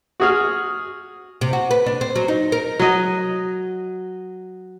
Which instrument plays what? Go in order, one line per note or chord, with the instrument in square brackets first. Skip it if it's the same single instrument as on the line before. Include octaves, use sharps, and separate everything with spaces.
[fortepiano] F#4 G#4 F6
[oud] C3
F#4
B4
D4
C4
F#3
D#4
A#4
[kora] F#3 D#5